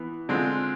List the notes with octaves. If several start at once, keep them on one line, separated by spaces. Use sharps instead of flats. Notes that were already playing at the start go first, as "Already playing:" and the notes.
Already playing: E3 B3
D3 G#3 C4 F4